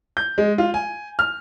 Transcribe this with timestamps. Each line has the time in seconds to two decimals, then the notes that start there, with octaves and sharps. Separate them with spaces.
0.17 G6
0.38 G#3
0.58 F4
0.74 G#5
1.19 F6